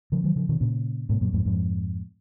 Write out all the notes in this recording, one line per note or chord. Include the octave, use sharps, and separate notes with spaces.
C#3 F3
D#3 F#3
C#3 F3
B2 D#3
A#2 C#3
G#2 B2
F#2 A#2
F2 G#2
F2 G#2